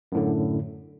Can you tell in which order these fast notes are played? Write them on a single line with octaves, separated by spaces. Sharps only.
F#2 A2 D3